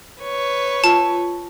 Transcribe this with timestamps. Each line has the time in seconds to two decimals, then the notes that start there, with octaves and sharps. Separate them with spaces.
0.22 B4 C#5
0.84 F4 A5 E6